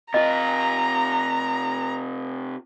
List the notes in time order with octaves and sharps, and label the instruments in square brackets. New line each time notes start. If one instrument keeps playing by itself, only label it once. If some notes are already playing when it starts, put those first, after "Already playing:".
[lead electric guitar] C3 F4 [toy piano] D#5 [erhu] A#5